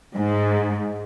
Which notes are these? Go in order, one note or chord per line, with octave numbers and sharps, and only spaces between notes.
G#2